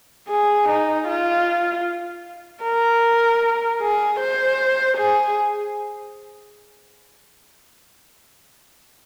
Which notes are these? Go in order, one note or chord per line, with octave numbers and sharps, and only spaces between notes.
G#4
D#4
F4
A#4
G#4
C5
G#4